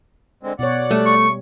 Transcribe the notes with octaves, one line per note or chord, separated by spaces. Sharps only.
D3 G#3 C4
B2 C#5 D5 F#5
G3 A3
C#6